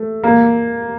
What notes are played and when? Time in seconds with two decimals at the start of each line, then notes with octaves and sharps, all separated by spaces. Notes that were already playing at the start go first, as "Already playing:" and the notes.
Already playing: A3
0.23 A#3